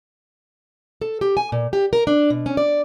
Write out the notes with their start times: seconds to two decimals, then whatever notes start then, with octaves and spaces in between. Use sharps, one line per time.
1.01 A4
1.21 G4
1.37 G#5
1.52 A#2
1.73 G4
1.93 A#4
2.07 D4
2.30 B2
2.46 C#4
2.57 D5